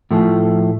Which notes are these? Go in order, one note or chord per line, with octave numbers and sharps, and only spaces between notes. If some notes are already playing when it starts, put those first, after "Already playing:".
A2 F3 A3